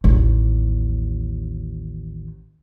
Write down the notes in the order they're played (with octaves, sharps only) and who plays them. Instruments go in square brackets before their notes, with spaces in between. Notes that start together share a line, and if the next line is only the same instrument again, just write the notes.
[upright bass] A1 D#2